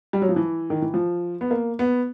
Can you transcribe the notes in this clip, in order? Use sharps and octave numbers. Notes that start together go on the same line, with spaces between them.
G3
F#3
F3
E3
D#3
E3
F3
B3
A#3
B3